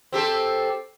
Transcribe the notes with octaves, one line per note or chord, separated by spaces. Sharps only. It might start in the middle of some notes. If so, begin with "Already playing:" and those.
C4 G4 A4